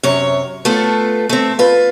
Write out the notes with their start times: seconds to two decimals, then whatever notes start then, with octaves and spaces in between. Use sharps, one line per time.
0.03 F#2 C3 C#5
0.65 A3 B3 F4 A4
1.29 A3 C4
1.59 F4 B4